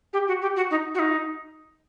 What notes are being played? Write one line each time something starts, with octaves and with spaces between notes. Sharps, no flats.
G4
F#4
G4
F#4
D#4
F#4
D#4